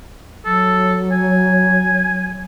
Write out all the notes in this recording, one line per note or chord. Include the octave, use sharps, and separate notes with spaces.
F#3 A4
G#5